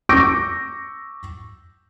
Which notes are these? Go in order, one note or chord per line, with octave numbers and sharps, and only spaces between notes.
C#6 D6 E6 G6 A#6 D7